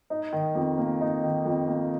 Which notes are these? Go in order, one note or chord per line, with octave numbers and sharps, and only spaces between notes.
D#4
D#3
F2
A#3
D#4
D#3
F2
A#3